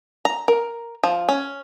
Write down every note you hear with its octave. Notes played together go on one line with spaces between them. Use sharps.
A#5
A#4
F3
C#4